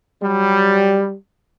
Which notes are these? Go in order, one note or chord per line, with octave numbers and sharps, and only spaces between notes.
F#3 G3